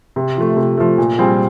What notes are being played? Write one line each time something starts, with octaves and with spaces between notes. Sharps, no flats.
C3
F3 A3
C3
F3 A3
A#2
G3 C4 F4 G#4